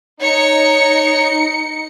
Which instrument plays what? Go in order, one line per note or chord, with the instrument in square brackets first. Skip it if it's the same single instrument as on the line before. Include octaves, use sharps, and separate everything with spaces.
[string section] D#4 C#7 [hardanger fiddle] C#5